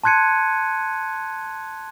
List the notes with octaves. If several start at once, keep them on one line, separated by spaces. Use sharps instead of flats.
A5 C6 F#6 G#6 C#7 D#7